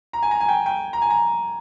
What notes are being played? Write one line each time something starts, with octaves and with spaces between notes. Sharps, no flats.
A#5
G#5
A#5
G#5
G5
G5
A#5
G#5
A#5